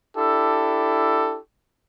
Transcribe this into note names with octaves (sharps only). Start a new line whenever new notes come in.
D4 E4 G4 A4